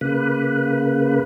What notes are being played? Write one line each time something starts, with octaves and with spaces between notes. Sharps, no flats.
C#3 A#3 B4